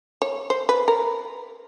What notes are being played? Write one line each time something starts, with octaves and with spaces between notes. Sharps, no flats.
C#5
C5
B4
A#4